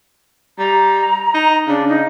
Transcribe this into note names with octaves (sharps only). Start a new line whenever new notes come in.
G3 A#5
D#4
C#3 D4
D#4